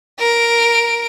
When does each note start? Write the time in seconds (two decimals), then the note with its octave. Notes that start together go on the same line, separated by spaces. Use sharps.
0.19 A#4 D7